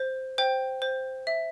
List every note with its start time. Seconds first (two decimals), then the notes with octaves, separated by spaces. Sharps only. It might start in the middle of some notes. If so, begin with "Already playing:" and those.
Already playing: C5
0.38 C5 G5
0.82 C5
1.27 E5